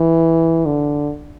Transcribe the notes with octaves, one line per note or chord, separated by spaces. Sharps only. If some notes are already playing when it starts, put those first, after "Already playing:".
Already playing: E3
D3